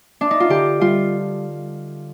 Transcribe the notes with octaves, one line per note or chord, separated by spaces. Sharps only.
D4
D#4
F4
D3 G4
G3 F4